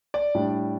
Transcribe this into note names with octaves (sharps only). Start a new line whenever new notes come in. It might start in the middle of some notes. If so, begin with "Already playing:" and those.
D5
A2 G3 D4